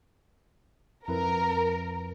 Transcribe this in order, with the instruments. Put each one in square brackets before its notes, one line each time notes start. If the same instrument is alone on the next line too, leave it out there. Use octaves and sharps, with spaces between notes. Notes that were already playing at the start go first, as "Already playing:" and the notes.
[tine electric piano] F2 E4 B4 [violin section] A#4